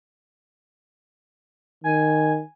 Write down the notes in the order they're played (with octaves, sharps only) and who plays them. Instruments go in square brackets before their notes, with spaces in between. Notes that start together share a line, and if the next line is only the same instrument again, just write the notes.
[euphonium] D#3 [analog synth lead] G#5